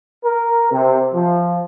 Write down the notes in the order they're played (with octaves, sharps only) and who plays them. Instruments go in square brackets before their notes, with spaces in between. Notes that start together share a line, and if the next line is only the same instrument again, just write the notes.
[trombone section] A#4
C3
F3